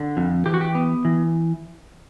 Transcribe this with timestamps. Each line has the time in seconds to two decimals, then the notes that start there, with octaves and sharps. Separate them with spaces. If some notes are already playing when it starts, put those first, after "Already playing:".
Already playing: D3
0.17 F2
0.46 E3 G4
0.54 F#4
0.61 G4
0.75 B3
1.05 E3